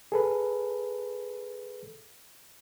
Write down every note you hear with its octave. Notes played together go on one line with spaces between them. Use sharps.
G#4 A4 B4